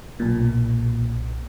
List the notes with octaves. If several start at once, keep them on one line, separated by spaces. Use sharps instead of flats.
B1 A#2